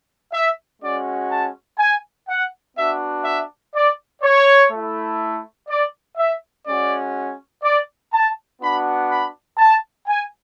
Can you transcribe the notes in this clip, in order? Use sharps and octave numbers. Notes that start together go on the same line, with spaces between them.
E5
G#3 C#4 F#4 D5
A5
G#5
F#5
B3 D4 F#4 E5
E5
D5
C#5
A3
E4
D5
E5
G#3 C#4 F#4 D5
D5
A5
B3 D4 F#4 B5
B5
A5
G#5